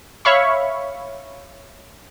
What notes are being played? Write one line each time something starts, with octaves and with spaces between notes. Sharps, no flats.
C#5 E5 F5 B5 C#6